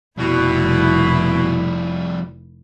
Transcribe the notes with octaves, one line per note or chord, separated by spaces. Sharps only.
F1 F2 B2 G3 E4